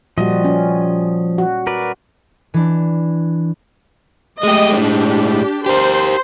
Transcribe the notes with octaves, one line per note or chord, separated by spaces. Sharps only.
A#2 F3 G3 F#4 D#5
C#4
F#4
A#4 B4 D5
E3 D4
G#3 A3 G4 D#5
A2 G#3 D4 G4
G4 A#4 C5